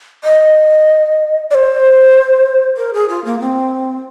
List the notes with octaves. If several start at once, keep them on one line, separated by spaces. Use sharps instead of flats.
D#5
D5
C5
A#4
G#4
F4
A#3
C4